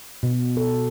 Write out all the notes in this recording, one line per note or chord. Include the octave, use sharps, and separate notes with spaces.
B2
A4